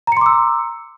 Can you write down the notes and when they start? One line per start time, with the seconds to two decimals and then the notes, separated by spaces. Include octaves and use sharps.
0.07 A#5
0.12 C#7
0.17 C6
0.21 D6
0.26 E6